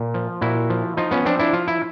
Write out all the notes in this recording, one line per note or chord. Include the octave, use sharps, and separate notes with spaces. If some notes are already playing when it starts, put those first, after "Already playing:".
Already playing: A#2
F3
A#2 E4 F#4
F3
F3 D#4 F4
B3 C#4
F3 C4 D4
D4 E4
F3 F4
E4